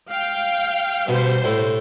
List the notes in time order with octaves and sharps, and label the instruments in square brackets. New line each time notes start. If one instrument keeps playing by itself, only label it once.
[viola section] F5 G5
[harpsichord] B2 [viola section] G3 C5
[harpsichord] A2